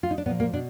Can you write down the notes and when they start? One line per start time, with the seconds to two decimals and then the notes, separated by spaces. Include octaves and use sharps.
0.03 F4
0.11 D#4
0.18 D4
0.26 A#2 B3
0.30 F3
0.40 A#3
0.53 B2 D4